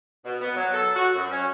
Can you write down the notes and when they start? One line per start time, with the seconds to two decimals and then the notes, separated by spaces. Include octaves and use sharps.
0.25 B2
0.41 B3
0.56 F#3
0.74 A4
0.96 F#4
1.15 F#2
1.31 C#4